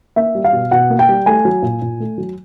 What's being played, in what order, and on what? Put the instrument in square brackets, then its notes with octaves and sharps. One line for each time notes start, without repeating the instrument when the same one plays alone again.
[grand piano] A#3 E5
G3
F5
B2
B2 F#5
A#3
G5
G3
A3 G#5
F#3
A#2
A#2
A3
F#3